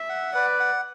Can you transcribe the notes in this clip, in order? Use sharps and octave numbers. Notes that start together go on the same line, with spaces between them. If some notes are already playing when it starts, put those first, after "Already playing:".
Already playing: E5
F#5
B4 D5
F#5